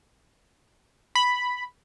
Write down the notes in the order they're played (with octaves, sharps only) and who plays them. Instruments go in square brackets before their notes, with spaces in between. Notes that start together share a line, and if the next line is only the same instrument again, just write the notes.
[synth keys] B5